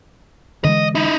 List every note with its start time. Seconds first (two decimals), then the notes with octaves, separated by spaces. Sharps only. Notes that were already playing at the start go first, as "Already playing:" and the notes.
0.64 D3 E3 G#3 D#5
0.95 D#4 E4